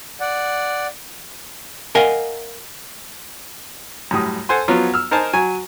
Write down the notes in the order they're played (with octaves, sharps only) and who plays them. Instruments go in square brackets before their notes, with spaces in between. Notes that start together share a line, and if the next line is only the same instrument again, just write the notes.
[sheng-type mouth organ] D5 F#5
[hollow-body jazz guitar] A#4 D#5 F5 F#5 G#5
[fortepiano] F#2 A2 G3 D#6
A4 C5 F#5 G#5 C6
F3 F#3 B3 C#4 F4 F#4
E6 F6
D#4 A#4 C5 G#5 A5
F#3 G#5